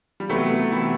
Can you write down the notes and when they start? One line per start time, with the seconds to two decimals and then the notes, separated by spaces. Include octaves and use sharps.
0.20 G3
0.29 C3 E3 F#3 A3 B3 E4 G4
0.71 C3 E3 B3 E4 G4